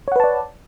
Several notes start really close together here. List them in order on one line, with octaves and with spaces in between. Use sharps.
C#5 F#5 B4 A5 D5